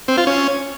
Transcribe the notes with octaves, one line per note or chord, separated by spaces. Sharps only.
C4
F4
C#4